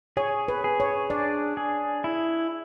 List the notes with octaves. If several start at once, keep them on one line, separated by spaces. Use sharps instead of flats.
G#4 C#5
B4
G#4
C#5
D4 D5
G#4
E4